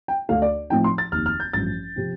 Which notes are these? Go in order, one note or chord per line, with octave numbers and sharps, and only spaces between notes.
G5
D2 D3 A3 D4 F5
D5
A2 F3 C4 D#4 G5
C6
A6
F1 D#2 D#3 F6
F6
G6
A1 G2 F3 A6
C3 F3 C4